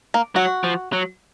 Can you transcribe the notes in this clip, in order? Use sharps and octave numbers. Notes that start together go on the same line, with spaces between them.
A#3
F#3 F#4
F3
F#3